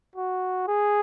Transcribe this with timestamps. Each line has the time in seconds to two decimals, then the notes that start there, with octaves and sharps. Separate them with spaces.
0.16 F#4
0.68 G#4